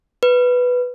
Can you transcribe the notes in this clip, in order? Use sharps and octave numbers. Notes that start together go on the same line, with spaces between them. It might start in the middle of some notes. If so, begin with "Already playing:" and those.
B4